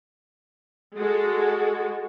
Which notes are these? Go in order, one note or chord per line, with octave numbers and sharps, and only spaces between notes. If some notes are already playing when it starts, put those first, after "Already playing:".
G#3 F#4 A4